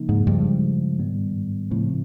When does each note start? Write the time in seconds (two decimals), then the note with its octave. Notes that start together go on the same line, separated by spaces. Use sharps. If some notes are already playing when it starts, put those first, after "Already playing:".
Already playing: C#3 F3 A#3 D#4
0.09 G#2
0.26 G2 C#3 F3 G#3
0.99 G#2 D#3 G3 B3
1.71 A2 C#3 F3 A3 C4 E4